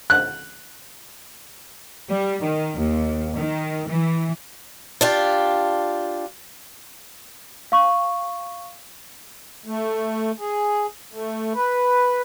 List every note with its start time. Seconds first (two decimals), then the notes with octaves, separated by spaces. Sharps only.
0.10 F#6
2.11 G3
2.41 D#3
2.78 D#2
3.37 D#3
3.88 E3
5.01 D4 F4 G4
7.72 F5 C#6
9.66 A3
10.40 G#4
11.13 A3
11.54 B4